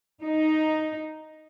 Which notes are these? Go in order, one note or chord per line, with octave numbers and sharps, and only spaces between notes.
D#4